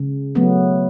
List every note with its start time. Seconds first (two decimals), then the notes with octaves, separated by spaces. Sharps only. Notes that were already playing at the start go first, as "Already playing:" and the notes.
Already playing: C#3
0.35 F#3 A3 B3